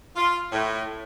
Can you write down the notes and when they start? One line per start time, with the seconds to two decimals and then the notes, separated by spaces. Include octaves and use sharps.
0.16 F4
0.51 A2